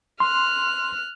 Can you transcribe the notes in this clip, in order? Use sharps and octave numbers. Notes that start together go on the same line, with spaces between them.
C6 F6 F#6